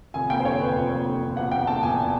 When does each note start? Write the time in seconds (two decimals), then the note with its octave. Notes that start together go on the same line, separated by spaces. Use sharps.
0.14 F1 G#5
0.30 D#2 G5
0.40 C5
0.45 D3 C#5
0.60 F1 B4
0.75 F1
0.91 D#2
1.07 D3
1.22 F1
1.36 E1 F#5
1.52 D#2 G5
1.67 D3 A5
1.83 E1 G#5